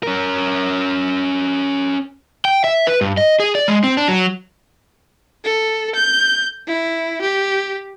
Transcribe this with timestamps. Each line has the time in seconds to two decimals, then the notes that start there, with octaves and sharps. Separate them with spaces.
0.03 C#4 A#4
2.45 G5
2.64 E5
2.87 B4
3.01 G2
3.17 D#5
3.40 G#4
3.55 D5
3.68 G#3
3.84 C4
3.97 D4
4.08 F#3
5.44 A4
5.95 G6
6.67 E4
7.22 G4